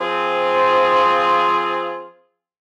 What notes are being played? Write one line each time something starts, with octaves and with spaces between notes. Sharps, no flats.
F3 C4 F4 G#4